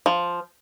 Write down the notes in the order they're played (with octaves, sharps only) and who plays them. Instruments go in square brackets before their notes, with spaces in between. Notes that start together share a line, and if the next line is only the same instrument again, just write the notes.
[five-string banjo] F3